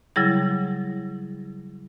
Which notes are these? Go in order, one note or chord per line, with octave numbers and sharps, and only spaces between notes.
C#3 F#3 G3 E4 G#4